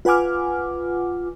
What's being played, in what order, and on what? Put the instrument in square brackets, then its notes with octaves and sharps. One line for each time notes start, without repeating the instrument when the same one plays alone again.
[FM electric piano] F4 B4 F#5 G#5 D6 F6